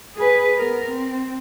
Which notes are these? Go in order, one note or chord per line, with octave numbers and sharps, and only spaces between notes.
G#4 B4
B3 A#4
C4